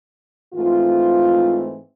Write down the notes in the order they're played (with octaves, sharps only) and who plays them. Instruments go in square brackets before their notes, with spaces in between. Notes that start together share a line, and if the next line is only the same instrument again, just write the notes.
[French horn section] G#2 E3 A3 C4 F4